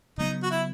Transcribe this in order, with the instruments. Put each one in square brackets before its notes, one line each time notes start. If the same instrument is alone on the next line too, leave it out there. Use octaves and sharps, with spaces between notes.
[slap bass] C#3 F#3 B3 [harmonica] D#4
[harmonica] F#4
E4